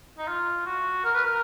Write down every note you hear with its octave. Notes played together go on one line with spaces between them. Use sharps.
D#4
F4
F#4
A#4
B4
A#4